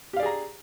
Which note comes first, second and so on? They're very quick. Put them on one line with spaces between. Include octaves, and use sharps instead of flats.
G4 F5 D5 G#4 A#5